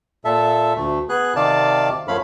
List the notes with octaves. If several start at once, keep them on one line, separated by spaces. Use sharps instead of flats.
A#2 A4 E5
D2 A3
B3 G#4 F#6
C3 D#3 D5 F5 A5
F#2 F3 A3 C#4 F5 B5